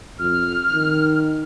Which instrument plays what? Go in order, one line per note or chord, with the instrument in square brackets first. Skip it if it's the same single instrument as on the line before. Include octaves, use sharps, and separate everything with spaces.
[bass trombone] F2 [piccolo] F6
[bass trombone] D#3